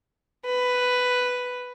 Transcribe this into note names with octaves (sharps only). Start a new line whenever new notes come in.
B4